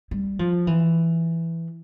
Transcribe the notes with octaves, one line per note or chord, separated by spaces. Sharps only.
G3
F3
E3